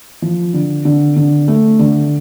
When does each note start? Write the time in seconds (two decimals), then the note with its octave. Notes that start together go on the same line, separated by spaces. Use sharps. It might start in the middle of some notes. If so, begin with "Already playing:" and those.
0.22 F3
0.54 D3
0.85 D3
1.16 D3
1.48 A3
1.79 D3